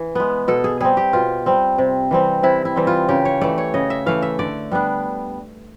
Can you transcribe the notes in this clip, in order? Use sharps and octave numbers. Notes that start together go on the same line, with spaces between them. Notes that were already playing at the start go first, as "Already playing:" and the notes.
Already playing: E3
G#3 B3
B2 A4
G#4
G3 C4 G#4
G4
B2 F4
G3 C4
C3
E3 G3 C4
C3 E4
E4
E3 G3 C4
F4
C#3 G4
C#5
E3 A3 D5
C#5
C#3 D#5
E5
E3 A3 F5
E5
D3 D5
G3 B3 D4